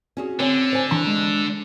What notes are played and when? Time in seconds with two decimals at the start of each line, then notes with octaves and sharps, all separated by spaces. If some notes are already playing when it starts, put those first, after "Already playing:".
0.17 C#4 F#4 G#4
0.40 D3 C4 C#5 G#5
0.73 C5 G#5
0.91 E3 D4 B5
1.07 G#3